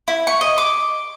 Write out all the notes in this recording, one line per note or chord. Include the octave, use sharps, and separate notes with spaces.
E4
C#6
D#5
D6